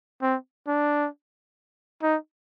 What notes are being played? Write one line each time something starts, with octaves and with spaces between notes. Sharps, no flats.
C4
D4
D#4